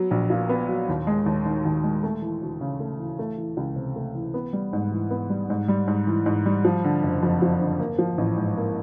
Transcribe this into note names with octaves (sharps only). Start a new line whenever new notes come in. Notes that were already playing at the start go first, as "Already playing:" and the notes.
Already playing: F#3 B3
A#1
A#2
B3
F#3
D#2
G#3
D#2
D#3
D#2
G#3
A3
E3
D2
C#3
A3
E3
A3
E3
C#2
C3
A3
E3
B3
G3
G#2
E3
B3
G3
G#2
G3
G#2
E3
G#2
G3
F3
D3
F#1
F2
F3
D3
A#3
F3
A1
G#2
A#3